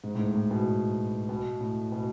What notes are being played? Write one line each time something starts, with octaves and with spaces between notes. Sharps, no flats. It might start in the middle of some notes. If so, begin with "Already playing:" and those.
G#2
A2
G#2
A2
B2
B2
A2
B2